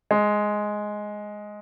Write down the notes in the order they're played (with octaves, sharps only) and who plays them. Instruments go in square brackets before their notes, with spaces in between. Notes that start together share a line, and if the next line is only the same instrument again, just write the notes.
[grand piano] G#3